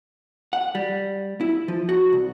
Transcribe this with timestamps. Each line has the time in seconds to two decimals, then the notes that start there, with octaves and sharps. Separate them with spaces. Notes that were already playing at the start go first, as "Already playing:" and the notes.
0.53 F#5
0.75 G3
1.41 E4
1.68 F3
1.89 F#4
2.12 C2